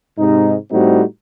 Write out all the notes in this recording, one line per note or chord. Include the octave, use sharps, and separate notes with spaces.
G#2 C3 D#4
A2 G3 A3 C4 D#4 F#4